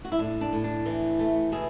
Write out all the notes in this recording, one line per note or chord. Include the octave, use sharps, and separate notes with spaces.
F#4
E4
A2 D4
D4
A2
D4
E3
A3
B2 E4 G#4